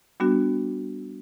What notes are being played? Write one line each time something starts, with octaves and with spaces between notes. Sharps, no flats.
G3 B3 D4 F#4